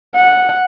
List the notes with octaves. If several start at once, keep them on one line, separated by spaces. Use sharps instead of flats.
F#5